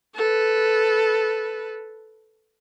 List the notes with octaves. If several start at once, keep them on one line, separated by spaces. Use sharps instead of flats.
A4 B4